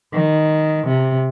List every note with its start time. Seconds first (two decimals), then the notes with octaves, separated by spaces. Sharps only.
0.12 D#3
0.88 C3